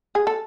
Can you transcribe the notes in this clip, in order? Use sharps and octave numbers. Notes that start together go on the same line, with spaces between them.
G#4
A4